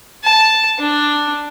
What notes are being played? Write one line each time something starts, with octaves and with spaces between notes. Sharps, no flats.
A5
D4